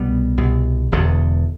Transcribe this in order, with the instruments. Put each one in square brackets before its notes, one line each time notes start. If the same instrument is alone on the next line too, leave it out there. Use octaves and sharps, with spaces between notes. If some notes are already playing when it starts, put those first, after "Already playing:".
Already playing: [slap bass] C2 B2 G3 B3
C2 B2
E1 E2 D3